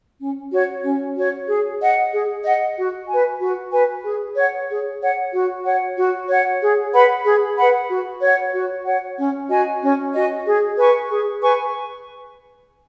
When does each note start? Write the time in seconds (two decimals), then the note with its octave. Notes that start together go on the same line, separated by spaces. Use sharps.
0.20 C#4
0.51 F#4 C#5
0.84 C#4
1.16 F#4 C#5
1.48 G#4
1.80 D#5 F#5
2.12 G#4
2.44 D#5 F#5
2.77 F#4
3.08 B4 G#5
3.41 F#4
3.72 B4 G#5
4.04 G#4
4.36 C#5 F#5
4.69 G#4
5.01 C#5 F#5
5.33 F#4
5.65 C#5 F#5
5.97 F#4
6.29 C#5 F#5
6.61 G#4
6.93 B4 F#5 B5
7.25 G#4
7.57 B4 F#5 B5
7.89 F#4
8.21 C#5 F#5
8.53 F#4
8.85 C#5 F#5
9.18 C#4
9.50 F#4 D#5 G#5
9.81 C#4
10.14 F#4 D#5 G#5
10.46 G#4
10.78 B4 G#5 C#6
11.10 G#4
11.41 B4 G#5 C#6